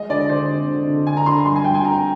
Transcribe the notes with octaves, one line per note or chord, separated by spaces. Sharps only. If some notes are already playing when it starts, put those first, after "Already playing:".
Already playing: G#3 D#5
D3 D5
D3 C5
C4
D3
D3
D3 G#5
A#5
D3 C6
G2 C6
G#5
G2 G5
G#5
C4 A#5